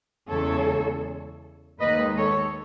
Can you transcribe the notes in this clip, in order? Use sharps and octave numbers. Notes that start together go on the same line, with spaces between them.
E2 C#3 G#3 A4 C#5
D#2 D#3 G#3 B4 D#5
A4 C#5